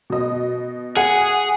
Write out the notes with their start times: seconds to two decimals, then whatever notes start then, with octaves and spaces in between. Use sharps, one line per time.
0.10 B2 D#5
0.97 G#4 F#5